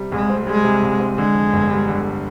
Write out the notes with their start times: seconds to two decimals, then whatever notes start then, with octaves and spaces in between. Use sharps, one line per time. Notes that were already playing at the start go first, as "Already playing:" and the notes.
Already playing: C3 G3
0.11 C2 G#3
0.30 C4
0.46 G3 G#3
0.64 C3
0.82 C2
1.00 C4
1.17 D3 G#3
1.35 F2
1.53 G1
1.70 G3
1.88 D3